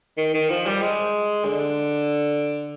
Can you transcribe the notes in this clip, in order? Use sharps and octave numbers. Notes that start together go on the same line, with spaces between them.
D#3
D#3
F3
G3
G#3
D3